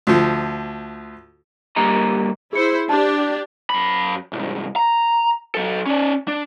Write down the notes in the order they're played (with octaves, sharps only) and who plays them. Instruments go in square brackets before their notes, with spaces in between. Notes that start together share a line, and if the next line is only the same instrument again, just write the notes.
[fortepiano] D2 F3
[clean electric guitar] G2 D3 A#3 G4 D#5 A#5
[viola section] E4 C5 [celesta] G#4 C#7
[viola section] D4 G4 [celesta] A5
[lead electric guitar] F#2 B5
C2 G#2
A#5
F#3 A4
C#4 D5
D4